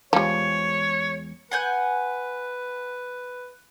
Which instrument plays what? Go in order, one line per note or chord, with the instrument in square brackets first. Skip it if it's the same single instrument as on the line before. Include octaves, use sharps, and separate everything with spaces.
[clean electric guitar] E2 G#3 [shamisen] F3 G3 [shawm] C#5
[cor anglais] B4 [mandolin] F#5 G#5 G6